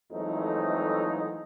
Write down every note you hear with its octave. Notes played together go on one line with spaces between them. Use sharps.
F2 E3 F#3 G#3 A3 D#4